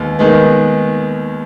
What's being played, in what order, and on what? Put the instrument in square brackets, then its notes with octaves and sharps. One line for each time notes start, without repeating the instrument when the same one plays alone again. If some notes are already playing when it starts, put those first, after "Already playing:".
Already playing: [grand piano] D#2 G#3 B3
D#3 G#3 B3